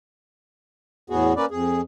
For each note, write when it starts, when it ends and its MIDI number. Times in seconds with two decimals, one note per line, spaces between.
1.10 1.33 40
1.10 1.33 45
1.10 1.33 59
1.10 1.33 66
1.10 1.33 68
1.36 1.45 58
1.36 1.45 61
1.36 1.45 71
1.36 1.45 74
1.51 1.81 41
1.51 1.81 68